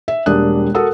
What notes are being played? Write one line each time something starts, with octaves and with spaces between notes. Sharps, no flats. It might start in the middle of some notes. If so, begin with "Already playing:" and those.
E5
E1 G3 A#3 D4 D#6 F#6
F#4 A4 A#4 F#5 D#6 E6